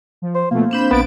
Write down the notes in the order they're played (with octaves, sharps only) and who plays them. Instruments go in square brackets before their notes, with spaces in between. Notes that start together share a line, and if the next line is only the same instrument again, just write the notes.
[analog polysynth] F3
[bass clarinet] C5
[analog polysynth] B2 F3 A3 [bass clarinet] A#3
[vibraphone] C4 D4 C5 [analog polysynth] B5 G6 E7
[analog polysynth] A#1 A6 D7 [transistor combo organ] B3